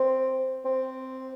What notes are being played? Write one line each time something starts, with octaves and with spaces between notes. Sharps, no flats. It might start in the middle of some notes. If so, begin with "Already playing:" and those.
Already playing: C4
C4